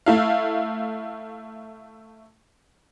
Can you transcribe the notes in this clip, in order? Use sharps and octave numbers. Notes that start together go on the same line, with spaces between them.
A3 E4 F5